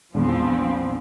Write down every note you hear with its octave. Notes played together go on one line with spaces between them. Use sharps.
A#1 E2 F3 B3 C4